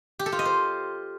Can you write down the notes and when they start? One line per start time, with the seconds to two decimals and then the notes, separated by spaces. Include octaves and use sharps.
0.19 G4
0.26 A4
0.32 F4
0.39 D#5
0.45 C5